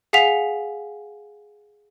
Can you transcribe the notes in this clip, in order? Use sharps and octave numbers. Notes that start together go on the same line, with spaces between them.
G#4 F5 F#5 G#5 B6 F7